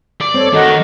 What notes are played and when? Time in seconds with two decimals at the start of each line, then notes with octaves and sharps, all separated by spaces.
0.21 D5
0.34 C4 A4 C#5
0.53 D#3 F#4 A4 D#5